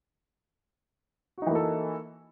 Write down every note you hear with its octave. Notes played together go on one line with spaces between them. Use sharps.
E3 A#3 D#4 F#4 A4